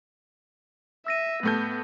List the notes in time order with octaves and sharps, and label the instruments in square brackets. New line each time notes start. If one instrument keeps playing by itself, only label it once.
[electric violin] E5 [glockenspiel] E6 A#6 D#7
[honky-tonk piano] A2 A3 G6 [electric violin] B3